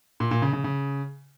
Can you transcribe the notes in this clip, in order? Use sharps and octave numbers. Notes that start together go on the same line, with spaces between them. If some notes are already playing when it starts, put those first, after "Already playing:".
A#2
A#2
C#3
C#3
C#3